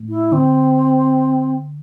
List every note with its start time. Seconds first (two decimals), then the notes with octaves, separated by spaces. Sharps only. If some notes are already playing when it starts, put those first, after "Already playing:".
Already playing: A2
0.09 E4
0.32 D3 C4